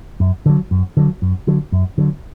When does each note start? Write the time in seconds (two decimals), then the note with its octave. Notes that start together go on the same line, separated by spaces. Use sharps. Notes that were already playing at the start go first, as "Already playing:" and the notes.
0.20 F#2
0.46 D3 F#3
0.71 F#2
0.97 D3 F#3
1.22 F#2
1.47 D3 F#3
1.72 F#2
1.98 D3 F#3